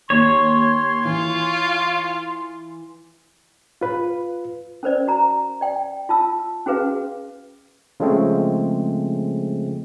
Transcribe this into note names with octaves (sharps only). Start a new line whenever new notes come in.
D#2 C#5 C6
E3 F4
F4 B4
C#4 A#4 C5 D5
F#4 A#5
D5 G5
F4 A5 E6
C#4 F#4 G#4 B4 F5
C#3 F3 G#3 A3 C4